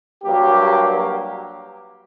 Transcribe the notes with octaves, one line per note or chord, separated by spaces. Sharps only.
G2 F#3 A#3 G4